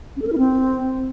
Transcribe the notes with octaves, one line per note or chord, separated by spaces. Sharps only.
C#4
A4
A#4
E4
C4